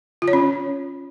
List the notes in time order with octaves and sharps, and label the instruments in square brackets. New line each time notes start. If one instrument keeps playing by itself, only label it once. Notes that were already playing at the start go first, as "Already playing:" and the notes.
[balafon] F4
C#5
C#4